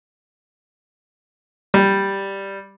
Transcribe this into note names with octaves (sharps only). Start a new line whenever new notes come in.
G3